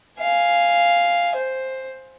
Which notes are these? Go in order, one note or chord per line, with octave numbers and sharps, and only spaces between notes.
F5 G#5
C5